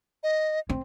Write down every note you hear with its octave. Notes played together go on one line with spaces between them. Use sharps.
D#5
C4